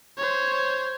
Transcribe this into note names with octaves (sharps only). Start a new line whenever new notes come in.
C5 C#5